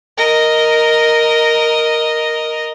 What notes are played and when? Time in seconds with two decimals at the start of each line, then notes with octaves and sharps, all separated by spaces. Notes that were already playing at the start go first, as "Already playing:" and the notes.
0.17 A#4 D#5